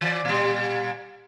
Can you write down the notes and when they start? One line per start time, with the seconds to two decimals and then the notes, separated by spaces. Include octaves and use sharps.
0.01 E3 D5
0.25 A#2 G3